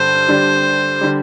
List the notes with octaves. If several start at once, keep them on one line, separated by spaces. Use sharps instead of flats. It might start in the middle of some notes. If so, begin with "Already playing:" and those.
Already playing: G2 D3 G3 C5
D3 G3 D4
D3 G3